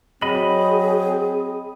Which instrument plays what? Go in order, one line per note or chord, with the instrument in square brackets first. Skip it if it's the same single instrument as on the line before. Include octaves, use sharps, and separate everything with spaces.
[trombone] F#3 [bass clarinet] C4 [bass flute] G#4 [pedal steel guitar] D#5 B5